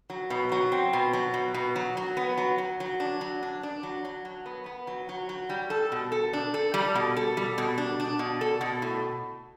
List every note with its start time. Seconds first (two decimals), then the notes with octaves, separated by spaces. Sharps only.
0.10 F#3
0.30 B2
0.52 F#3
0.72 C4
0.93 B2
1.13 F#3
1.34 B2
1.54 B2
1.76 F#3
1.97 F#3
2.17 B3
2.38 F#3
2.58 F#3
2.80 F#3
3.00 D4
3.21 F#3
3.43 D4
3.63 D4
3.83 F#3
4.05 F#3
4.25 F#3
4.46 B3
4.66 B3
4.87 F#3
5.09 F#3
5.29 F#3
5.50 G3
5.70 A4
5.92 B2
6.12 A4
6.33 D4
6.54 A4
6.74 G3
6.95 B2
7.17 A4
7.37 G3
7.58 B2
7.78 D4
8.00 D4
8.19 B2
8.41 A4
8.61 B2
8.82 A2